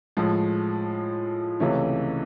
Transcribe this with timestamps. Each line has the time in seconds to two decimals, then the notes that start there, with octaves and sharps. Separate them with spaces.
0.17 A2 F3 G#3
1.60 C#2 C3 E3 A3 C#4